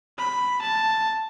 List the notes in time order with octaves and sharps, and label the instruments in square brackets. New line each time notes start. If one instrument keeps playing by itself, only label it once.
[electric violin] B5
A5